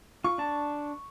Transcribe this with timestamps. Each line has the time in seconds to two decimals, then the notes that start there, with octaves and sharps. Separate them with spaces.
0.24 F4 C#6
0.38 D4 A5